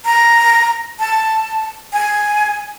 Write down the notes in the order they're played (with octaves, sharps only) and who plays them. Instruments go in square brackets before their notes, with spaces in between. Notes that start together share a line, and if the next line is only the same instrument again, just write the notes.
[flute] A#5
A5
G#5